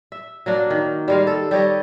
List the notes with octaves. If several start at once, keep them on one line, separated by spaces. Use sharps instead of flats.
E5
F#3 A#3 D4
D#3
G3 G#3 F5
A4
G3 G4 C#5 D#5